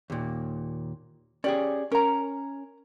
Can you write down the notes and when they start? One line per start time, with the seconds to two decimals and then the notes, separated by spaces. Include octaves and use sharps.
0.10 D#2 A#2
1.44 C#4 G4 G#4 D5
1.92 C#4 A#4 A#5